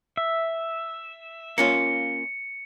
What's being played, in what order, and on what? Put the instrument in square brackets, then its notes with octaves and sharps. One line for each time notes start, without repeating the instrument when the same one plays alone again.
[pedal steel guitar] E5
[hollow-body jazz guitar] A#3 C#4 F4 [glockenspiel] C#7